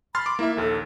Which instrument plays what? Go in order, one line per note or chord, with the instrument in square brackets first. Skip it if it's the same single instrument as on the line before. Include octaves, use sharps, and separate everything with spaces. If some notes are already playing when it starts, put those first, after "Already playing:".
[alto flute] B5 [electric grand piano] C6 F6 A6
[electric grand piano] D6
[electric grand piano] A#3 E5 [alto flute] E4
[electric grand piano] A#1 D#2 [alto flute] A4